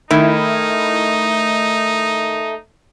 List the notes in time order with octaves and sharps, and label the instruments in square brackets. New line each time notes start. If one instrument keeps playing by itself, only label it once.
[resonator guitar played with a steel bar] D#3 [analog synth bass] A3 [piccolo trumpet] D#4 [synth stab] E4